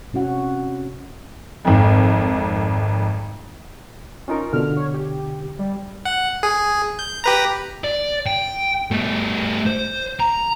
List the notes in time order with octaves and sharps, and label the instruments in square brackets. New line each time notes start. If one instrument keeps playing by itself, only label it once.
[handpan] C3 C#4 F#4 F#5
[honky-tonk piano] G#1 F2
[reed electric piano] C#4 D#4 A#4 [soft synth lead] F4
[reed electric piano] B2 D3 [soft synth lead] F6
[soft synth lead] C#5
G4
G3
[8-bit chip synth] F#5
G#4
G6
G4 B4 A#5
[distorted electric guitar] D5
G5
G3 A3
C5
A#5